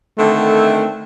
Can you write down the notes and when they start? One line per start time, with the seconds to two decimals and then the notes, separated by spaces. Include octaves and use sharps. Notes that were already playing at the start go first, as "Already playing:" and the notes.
0.18 D3 D#3 A3 C4